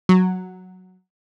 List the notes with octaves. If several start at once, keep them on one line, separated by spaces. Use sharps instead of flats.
F#3